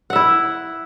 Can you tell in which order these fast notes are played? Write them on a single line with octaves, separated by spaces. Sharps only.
F#5 E5 E4